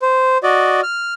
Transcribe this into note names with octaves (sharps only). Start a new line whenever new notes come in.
C5
F#4 D5 D#5
F6